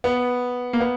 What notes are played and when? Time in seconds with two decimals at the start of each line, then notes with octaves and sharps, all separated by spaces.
0.04 B3
0.73 A#3
0.81 B3